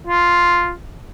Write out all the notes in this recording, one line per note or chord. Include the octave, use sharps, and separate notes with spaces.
F4